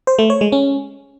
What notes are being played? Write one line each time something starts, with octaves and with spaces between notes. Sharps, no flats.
C5
A3
C#5
G#3
C#4